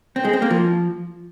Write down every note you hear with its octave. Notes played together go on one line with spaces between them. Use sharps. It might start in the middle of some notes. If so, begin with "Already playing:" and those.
C4
G#3
C4
A#3
F3